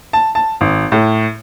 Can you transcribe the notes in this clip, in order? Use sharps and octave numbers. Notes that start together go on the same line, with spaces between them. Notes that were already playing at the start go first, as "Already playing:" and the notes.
A5
A5
G#1
A2